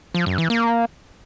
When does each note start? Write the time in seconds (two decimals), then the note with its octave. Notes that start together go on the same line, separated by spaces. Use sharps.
0.14 F3
0.26 F#2
0.38 E3
0.50 A#3